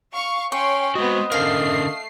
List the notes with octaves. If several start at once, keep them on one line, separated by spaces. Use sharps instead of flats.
F5 C#6
C#4 C#5 G5 C6 C#6
G#3 B3 C4 F#4 C5 D#5
D3 A3 C#4 A#4 F5 C7